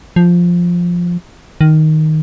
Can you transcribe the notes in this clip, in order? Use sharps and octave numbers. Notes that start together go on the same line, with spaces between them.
F3
D#3